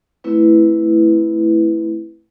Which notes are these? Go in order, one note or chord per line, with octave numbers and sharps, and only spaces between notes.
A3 C4 E4 B4